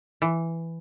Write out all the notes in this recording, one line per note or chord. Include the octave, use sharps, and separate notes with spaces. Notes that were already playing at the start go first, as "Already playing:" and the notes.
E3